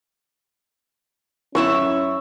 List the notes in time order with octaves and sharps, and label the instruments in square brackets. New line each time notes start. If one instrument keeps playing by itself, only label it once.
[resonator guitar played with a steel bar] F#2 E4 E5 [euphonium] C#4 [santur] C#6